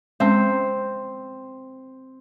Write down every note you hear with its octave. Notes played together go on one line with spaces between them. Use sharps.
G#3 C4 C#4